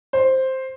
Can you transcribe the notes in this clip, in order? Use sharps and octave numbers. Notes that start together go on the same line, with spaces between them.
C5